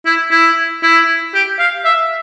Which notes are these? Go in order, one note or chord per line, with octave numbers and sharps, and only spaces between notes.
E4
E4
E4
G4
F5
E5